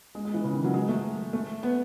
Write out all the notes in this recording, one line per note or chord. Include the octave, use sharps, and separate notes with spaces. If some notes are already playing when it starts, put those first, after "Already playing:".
G#3
G#3
E3
C#3
D#3
F#3
G#3
A3
A3
B3